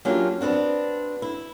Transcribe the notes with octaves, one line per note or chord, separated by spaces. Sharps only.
F#3 A#3 C#4 D4 F4 G4
B3 C4 D4 F#4
E4